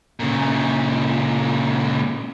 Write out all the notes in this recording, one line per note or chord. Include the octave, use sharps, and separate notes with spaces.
A#2 C#3